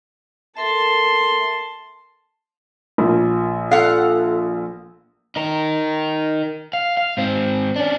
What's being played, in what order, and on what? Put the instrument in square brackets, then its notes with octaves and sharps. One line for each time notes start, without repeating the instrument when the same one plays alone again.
[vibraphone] A4 A#4 E5 [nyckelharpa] A5 C6
[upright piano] A#1
[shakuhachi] A4 [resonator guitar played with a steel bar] F5 F#5
[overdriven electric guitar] D#4 A#4
F5
F5
G#2 C4
C#4 D4